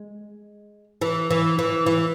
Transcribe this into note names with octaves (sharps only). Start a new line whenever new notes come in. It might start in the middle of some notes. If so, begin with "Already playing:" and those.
Already playing: G#3
E3
E3
E3
E3